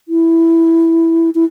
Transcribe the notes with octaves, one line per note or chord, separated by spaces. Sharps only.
E4
E4